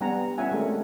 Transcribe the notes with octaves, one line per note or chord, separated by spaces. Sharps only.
G3 B3 D4 F#5 G#5 A#5
G3 C#4 F4 E5 F#5 G#5
G#3 A3 C4 D4 A4 A#4